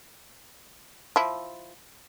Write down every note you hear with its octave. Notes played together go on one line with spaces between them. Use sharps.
F3 E4